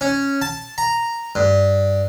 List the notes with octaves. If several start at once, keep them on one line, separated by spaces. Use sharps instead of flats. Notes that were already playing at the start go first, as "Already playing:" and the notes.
C#4
A5
A#5
G2